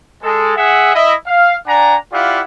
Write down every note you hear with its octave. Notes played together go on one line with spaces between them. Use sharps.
G#3 A4
G#4 E5 F#5
E4 D#5 E5
F5
D4 D5 F#5 G#5 A#5
E4 F4 G4 D5 F5 F#5